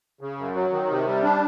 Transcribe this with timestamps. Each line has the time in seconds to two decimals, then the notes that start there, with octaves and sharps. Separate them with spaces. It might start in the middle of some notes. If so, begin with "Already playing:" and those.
0.21 C#3
0.38 F#2
0.55 F#3
0.72 D#3
0.89 C3
1.06 G3
1.23 D4